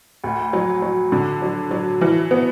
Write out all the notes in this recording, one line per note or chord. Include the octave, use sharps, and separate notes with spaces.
D2
F#3
F#3
D3
F#3
F#3
E3
B3